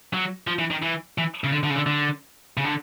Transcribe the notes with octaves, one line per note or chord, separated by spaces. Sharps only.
F#3
F3
E3
D#3
E3
E3
C#3
D3
D3
C#3
D3
D3
C#3
D3